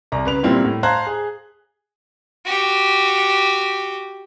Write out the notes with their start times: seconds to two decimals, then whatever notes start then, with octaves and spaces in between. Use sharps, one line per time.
0.12 C2 A#5
0.25 C#3 B4 F7
0.43 A#2 G3 A#3 C4 E4 F4
0.65 A2
0.83 C5 F5 A5 A#5 F#6 G#6
1.07 G#4
2.45 F#4 G4